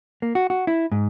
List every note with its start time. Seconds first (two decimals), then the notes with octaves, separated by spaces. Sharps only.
0.22 A#3
0.35 F#4
0.50 F#4
0.67 E4
0.92 G#2